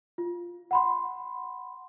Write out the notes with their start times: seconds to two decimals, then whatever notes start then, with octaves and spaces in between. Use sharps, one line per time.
0.18 F4
0.71 F#5 B5 C6